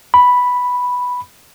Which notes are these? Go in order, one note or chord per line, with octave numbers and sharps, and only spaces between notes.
B5